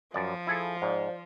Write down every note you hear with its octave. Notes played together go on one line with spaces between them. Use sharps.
F#2 F3 D5
E4 G#4 A4
G#2 C5 D5